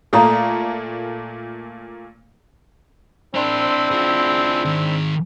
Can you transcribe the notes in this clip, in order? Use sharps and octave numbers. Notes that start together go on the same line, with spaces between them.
A#2 A3 A#3 A4 D5 A#5
C4 D4 E4 A#4 C5
F4 G#4
D#3 G#4